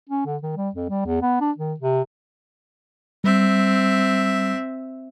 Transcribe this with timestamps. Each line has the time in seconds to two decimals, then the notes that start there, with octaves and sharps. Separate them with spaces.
0.09 C#4
0.26 D3
0.43 D#3
0.57 G3
0.75 F2
0.90 G3
1.06 E2
1.22 B3
1.41 D4
1.58 D#3
1.80 C3
3.24 G3 C4 E5